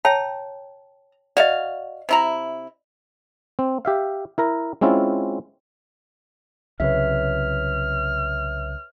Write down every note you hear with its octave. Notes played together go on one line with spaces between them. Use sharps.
C#5 G5 A5 A#5
F#4 D5 D#5 F5
C3 E4 A#5
C4
G4 E5 F5
E4 A#4 A#5
G#3 C4 C#4 E4 F4
C2 C#3 F#3 B4 C#5 E5 F6